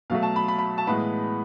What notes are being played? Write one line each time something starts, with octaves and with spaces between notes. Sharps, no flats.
B2 F#3 A3 F5
A5
B5
B5
B5
A5
A2 E3 G#3 B3 B5